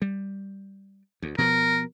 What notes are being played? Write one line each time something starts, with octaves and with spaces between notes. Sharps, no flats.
G3
D2
B2 F3 B3 A#4